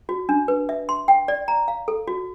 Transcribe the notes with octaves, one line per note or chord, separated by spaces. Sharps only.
F#4
D4
B4
E5
C6
G5
D5
A#5
F5
A4
F#4